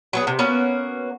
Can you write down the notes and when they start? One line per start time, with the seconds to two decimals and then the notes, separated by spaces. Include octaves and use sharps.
0.13 F#3 B3 G#4
0.27 C3
0.39 A#3 B3 C#4 F#4